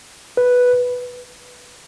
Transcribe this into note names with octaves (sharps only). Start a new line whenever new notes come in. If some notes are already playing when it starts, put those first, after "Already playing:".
B4